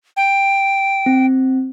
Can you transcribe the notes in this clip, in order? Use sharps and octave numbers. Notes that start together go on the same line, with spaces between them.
G5
C4